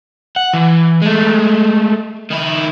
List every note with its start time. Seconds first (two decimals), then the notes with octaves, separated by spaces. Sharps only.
0.36 F#5
0.53 E3
1.02 G#3 A3
2.31 D#3 E4